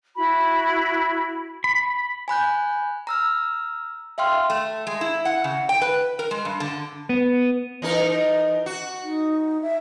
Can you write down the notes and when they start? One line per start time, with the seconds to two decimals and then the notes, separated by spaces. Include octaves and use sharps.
0.17 E4 F#4 B5
1.64 B5
2.28 G#5 B5 F#6 G6
3.07 A#5 E6 F6
4.18 E5 F5 G5 C6 F6
4.50 A3
4.87 G#3
5.01 E4
5.25 F#5
5.44 C#3
5.69 G5
5.81 B4
6.19 A#4
6.31 G#3
6.45 G2
6.60 D3
7.09 B3
7.82 E3 D#4 A#4
8.66 F#4
9.03 D#4
9.62 E5